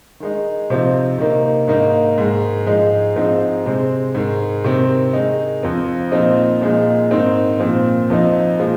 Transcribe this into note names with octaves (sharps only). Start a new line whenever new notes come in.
D#3 G#3 D#4
C3 F3 C4 D#4
C3 D#3 A#3 D#4
G#2 D#3 A#3 D#4
G#2 D#3 G#3
G#2 F3 G#3 D#4
G#2 F3 G#3 C4 D#4
C3 G#3 C4
G#2 D#3 G#3
C3 D#3 C4
D#3 G#3 D#4
F2 F3 C4
A#2 F3 C4 D#4
A#2 F3 G#3 D#4
G#2 D#3 C4 D#4
A#2 F3 C4
F2 F3 C4 D#4
A#2 F3 G#3